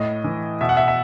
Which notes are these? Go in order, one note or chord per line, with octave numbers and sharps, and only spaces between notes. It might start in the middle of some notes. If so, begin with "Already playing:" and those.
Already playing: A2 D#5
E3
B2 E5
F#5
E5
E5